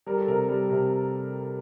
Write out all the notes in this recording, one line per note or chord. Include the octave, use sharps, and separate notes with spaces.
G3 A#4
A4
C3 A#4
G3
C3